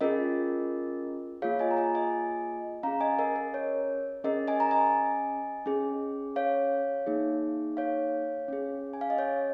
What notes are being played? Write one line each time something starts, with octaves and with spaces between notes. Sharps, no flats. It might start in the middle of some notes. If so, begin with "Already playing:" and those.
C#4 F4 G#4 A#4 D#5
A#3 F4 G#4 C#5 F5
D#5 G#5
A#5
D#5 G#5
D#5 G#5
C#4 G#4 F5 A#5
D#5 G#5
A#4 D#5
A#4
C#5
C#4 G#4 A#4 D#5
D#5 G#5
A#5
D#5 G#5
C#4 G#4
C#5 F5
A#3 D#4 G#4
C#5 F5
C#4 G#4
G#5
F5
D#5
C#5